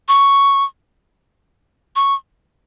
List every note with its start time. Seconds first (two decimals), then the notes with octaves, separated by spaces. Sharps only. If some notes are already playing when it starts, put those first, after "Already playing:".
0.08 C#6
1.96 C#6